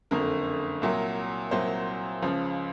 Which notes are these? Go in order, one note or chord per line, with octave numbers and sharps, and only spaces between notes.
F#1 F2 D3 A#4
C2 A#2 F#3
C2 A#2 F#3 C5
C#2 C#3 F3